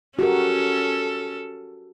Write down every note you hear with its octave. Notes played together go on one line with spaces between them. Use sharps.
C#4 F#4 G4 A4 A#4